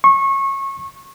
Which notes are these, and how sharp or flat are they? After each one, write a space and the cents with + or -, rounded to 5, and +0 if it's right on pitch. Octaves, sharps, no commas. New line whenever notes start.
C#6 -25